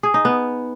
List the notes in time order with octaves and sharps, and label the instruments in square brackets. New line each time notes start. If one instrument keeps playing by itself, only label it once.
[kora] G#4
D#4
B3